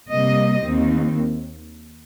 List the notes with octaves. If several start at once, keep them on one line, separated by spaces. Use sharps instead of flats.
C3 G3 A#3 D#5
D#2 D#3 C4